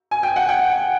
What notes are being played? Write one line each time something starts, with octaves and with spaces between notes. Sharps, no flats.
G#5
G5
F#5
G5